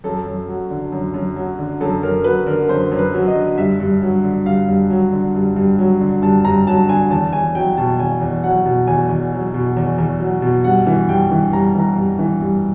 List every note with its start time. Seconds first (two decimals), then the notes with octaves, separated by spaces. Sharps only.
0.04 F#2 A4
0.26 F#2
0.48 F#3
0.70 D3
0.92 F#2
1.14 F#2
1.36 F#3
1.59 D3
1.81 F#2 A4
2.03 F#2 A#4
2.24 F#3 B4
2.47 D3 A#4
2.69 F#2 C5
2.91 F#2
2.98 B4
3.13 F#3
3.28 D#5
3.35 D3
3.58 G2 E5
3.80 G2
4.02 F#3
4.24 D3
4.45 G2 F5
4.69 G2
4.90 F#3
5.12 D3
5.35 G2
5.56 G2
5.79 F#3
6.01 D3
6.22 G2 A5
6.45 G2 A#5
6.67 F#3 A5
6.89 D3 G#5
7.10 E2 A5
7.33 E2 G#5
7.55 F#3 G5
7.77 B2 A5
8.00 E2 G#5
8.21 E2
8.44 F#3 F#5
8.66 B2
8.87 E2 G#5
9.09 E2
9.32 F#3
9.54 B2
9.77 E2
9.98 E2
10.20 F#3
10.42 B2
10.64 G2 F#5
10.87 E3
11.09 G2 G5
11.31 E3
11.53 G2 A#5
11.75 E3 A#5
11.97 G2
12.19 E3
12.41 G2